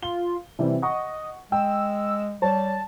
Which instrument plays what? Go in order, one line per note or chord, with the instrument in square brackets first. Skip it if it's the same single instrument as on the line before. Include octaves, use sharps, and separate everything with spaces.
[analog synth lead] F4 [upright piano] G7
[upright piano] C3 E3 [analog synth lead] G3
[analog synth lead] D#5 [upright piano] F#5 C#6
[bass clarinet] G#3 [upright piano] G5 [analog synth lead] E6
[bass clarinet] G3 [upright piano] C#5 [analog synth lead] A5